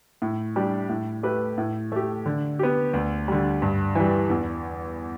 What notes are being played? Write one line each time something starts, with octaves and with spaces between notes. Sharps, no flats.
A2
G3 D4 G4
A2
A3 G4 B4
A2
A3 G4
D3
B3 G4
D2
D3 G3
G2
E3 G3
E2